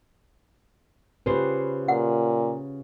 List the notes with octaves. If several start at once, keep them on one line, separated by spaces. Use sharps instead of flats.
C#3 F4 G4 B4 C5
A#2 F#5